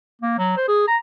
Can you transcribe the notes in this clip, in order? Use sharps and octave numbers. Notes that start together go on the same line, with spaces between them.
A#3
F#3
C5
G#4
A#5